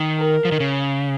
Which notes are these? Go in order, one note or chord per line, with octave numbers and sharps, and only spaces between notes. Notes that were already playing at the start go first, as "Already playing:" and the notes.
Already playing: D#3
A#4
F3
D#3
C#3